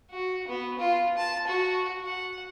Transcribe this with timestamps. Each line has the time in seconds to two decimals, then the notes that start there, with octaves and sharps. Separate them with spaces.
0.11 F#4
0.48 B3
0.79 F4
1.17 A5
1.47 F#4
2.06 F#5